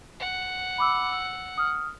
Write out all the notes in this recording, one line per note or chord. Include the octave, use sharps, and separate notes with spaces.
F#5
B5 D6 E6
E6
D#6 F6